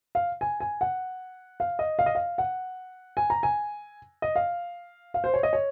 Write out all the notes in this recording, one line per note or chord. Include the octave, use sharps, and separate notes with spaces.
F5
G#5
G#5
F#5
F5
D#5
F5
D#5
F5
F#5
G#5
A#5
G#5
D#5
F5
F5
C5
C#5
D#5
C#5